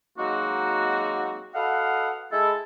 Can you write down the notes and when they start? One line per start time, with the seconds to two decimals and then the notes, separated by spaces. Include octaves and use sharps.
0.19 F#3 G#3 A#3 C4 D#4 F#4
1.55 F#4 A4 B4 D#5 F5 F#5
2.32 G#3 E4 A4